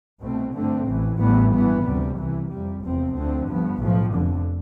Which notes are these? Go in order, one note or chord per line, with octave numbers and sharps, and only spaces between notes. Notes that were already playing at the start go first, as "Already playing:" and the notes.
C2 B2 A3 C4
G2 D3 A3 C4
A1 A2 E3
A1 A2 E3 G3 B3
G2 E3 B3
D2 C3 G3
C2 C3 E3
F2 C3 G3
F1 E2 C3 F3 C4
D2 D3 F3 C4
G2 F3 B3
B1 A2 F3
F1 F2 D3